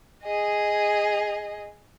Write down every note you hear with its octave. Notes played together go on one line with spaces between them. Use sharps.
G#4 D#5